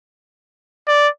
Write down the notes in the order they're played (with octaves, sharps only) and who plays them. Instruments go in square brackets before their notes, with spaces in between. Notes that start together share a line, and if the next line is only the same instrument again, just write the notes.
[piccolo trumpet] D5